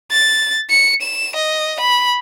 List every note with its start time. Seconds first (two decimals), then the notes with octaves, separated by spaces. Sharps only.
0.12 A6
0.70 C#7
1.01 E7
1.36 D#5
1.80 B5